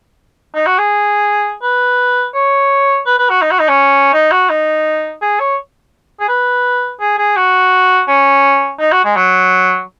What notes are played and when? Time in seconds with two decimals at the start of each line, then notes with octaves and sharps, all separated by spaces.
0.55 D#4
0.66 F#4
0.78 G#4
1.62 B4
2.34 C#5
3.06 B4
3.18 B4
3.30 F#4
3.42 D#4
3.51 F#4
3.59 D#4
3.68 C#4
4.13 D#4
4.31 F#4
4.49 D#4
5.21 G#4
5.39 C#5
6.20 G#4
6.28 B4
7.00 G#4
7.18 G#4
7.37 F#4
8.08 C#4
8.80 D#4
8.92 F#4
9.04 G#3
9.16 F#3